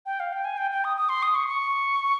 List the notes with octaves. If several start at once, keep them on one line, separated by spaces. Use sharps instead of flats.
G5
F5
G5
G#5
G5
G5
D#6
D#6
C6
D#6
C#6
C#6